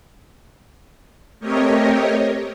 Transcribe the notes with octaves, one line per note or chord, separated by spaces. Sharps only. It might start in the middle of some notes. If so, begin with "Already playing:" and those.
A3 C4 G4 A#4 C#5 D#5